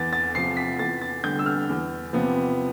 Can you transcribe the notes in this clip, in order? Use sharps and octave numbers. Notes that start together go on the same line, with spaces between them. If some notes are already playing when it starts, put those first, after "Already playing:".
Already playing: E2 A6
A6
C3 F3 C7
B6
E2 A6
A6
D3 G3 B3 G6
E6
F6
E2
C3 F3 B3